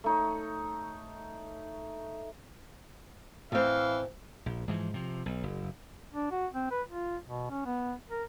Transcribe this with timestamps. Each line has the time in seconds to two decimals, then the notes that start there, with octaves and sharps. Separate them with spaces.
0.04 A3 D#4 C#5
3.52 A2 E3 C4 F5
4.46 A#1
4.68 G#2 E3 F3
4.94 C3 F3
5.26 B1
5.43 F#1
6.14 D4
6.31 F#4
6.54 C4
6.71 B4
6.88 F4
7.26 B2
7.50 C#4
7.66 B3
8.09 A#4